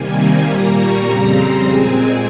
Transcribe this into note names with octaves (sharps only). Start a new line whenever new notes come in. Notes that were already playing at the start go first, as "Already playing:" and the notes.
Already playing: C3 D#3 G3 A#3 G#5
G#5
A#2 G3 A#3 A#5
C#6
F2 C#3 G3 C4 A#5
C6
A#2 G#3 C4 G#5